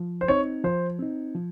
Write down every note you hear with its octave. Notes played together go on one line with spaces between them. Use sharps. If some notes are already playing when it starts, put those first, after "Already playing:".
Already playing: F3
C5
C4 D#4 C#5
F3 C5
C4 D#4
F3